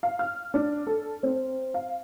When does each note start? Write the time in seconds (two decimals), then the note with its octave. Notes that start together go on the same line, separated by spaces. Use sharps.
0.03 F5
0.19 F6
0.54 D4
0.87 A4
1.23 C4
1.74 F5